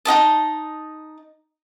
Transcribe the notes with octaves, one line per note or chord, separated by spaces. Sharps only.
D#4 F#4 D#5 A5